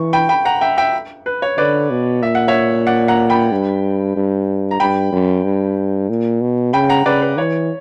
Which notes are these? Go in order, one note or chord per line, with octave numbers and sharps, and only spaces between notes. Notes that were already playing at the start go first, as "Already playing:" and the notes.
Already playing: E3 C#6
G5 B5
G5 B5
F#5 A#5
E5 G5
E5 G5
B4
C#5
D3 B4 D5
B2
A#2 E5
F#5
C#5 E5
D5 F#5
F#5 A#5
G5 B5
G2
G2
A#5
G2 G5 B5
F#2
G2
A#2
B2
C#3 G5 B5
F#5 A#5
C#3 B4 D5
B4
E3 C#5